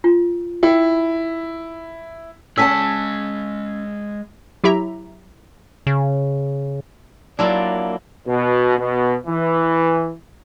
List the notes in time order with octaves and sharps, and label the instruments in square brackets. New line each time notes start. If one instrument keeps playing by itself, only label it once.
[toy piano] F4
[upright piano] E4 [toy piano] G5
[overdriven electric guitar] G#3 C#5 [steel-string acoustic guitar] C#4 G#5 A5 [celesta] E6 B6
[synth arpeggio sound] F#3 E4 G4 E5 A#5
[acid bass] C#3
[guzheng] F#3 E4 F4 [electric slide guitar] A#3 D4 [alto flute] D5
[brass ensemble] B2
B2
E3